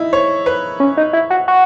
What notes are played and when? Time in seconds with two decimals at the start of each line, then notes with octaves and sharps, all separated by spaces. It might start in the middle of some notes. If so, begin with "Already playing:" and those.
Already playing: D#4 E4
0.13 C#5
0.46 B4
0.80 C#4
0.97 D#4
1.13 E4
1.30 F#4
1.48 F#4